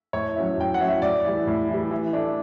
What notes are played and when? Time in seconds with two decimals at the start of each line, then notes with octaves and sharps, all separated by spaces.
0.13 A2 C#5
0.35 F#3 C#4 E4
0.58 A2 G5
0.74 F#5
0.80 F#3 C#4 E4
0.88 E5
1.02 A2 D5
1.24 E3 G3
1.47 A2
1.69 E3
1.74 G3
1.91 E3
2.13 A3 D4